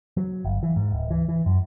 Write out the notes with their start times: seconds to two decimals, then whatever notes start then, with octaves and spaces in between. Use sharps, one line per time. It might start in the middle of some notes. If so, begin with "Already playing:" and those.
0.17 F#3
0.45 G1
0.63 E3
0.76 G#2
0.92 D1
1.11 E3
1.29 E3
1.46 F#2